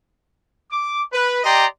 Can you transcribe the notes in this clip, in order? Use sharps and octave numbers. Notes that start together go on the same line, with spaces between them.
D6
B4
G4 D5 D#5 G5 A#5 C6